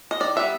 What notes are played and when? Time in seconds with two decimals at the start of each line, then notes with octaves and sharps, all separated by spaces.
0.11 D#5
0.20 D#3 D5
0.36 G3 B3 E5